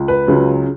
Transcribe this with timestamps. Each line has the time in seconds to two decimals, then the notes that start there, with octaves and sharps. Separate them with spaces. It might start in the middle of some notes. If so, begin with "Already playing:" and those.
Already playing: C#2
0.08 B4
0.26 C#2 C#3 F#3